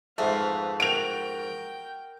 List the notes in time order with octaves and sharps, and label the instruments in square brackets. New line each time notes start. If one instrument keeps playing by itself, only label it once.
[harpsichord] F2 G#2 [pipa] A3 [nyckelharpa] B4 F5
[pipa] F#4 [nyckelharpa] A#4 G5 [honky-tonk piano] D7 F7